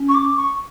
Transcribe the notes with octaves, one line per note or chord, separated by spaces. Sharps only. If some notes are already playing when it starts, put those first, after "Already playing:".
Already playing: C#4
C#6
D6
C#6